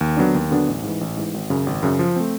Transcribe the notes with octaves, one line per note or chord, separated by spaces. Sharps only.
D#2
D3 F#3 B3 D4
D#2
D3 F#3 B3 D4
A1
G#2 E3
A1
G#2 E3
G#1
F#2 C#3
G#1
F#2 C#3
F3
A3 C4